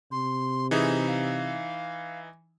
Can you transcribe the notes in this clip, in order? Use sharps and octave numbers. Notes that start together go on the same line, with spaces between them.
C3 C6
E3 D#4 G#4 E5
F5